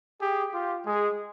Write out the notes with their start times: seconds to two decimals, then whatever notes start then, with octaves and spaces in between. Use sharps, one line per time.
0.21 G4 G#4
0.53 F4 G4
0.86 G#3 G#4